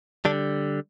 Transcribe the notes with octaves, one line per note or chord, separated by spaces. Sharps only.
D3 G3 D4